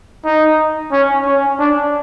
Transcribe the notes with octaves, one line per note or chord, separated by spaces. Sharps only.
D#4
C#4
C#4
D4